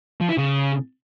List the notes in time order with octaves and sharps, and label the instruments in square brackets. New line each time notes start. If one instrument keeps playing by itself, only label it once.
[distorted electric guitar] F3
E4
C#3